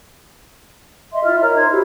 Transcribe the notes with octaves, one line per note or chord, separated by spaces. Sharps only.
D#5 E5 C6
E4 F4 E5 F6
A#4 C#5 D#5 A#5
D#4 C5 C6 G#6
E4 F#4 G4